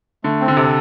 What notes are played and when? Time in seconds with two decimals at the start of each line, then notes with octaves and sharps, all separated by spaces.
0.24 D3 A3
0.40 C4
0.48 D3
0.57 C3 A4